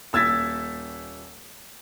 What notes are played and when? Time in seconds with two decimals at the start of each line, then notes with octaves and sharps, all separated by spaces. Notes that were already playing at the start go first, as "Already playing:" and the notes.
0.13 D#1 E6 G#6 A6 B6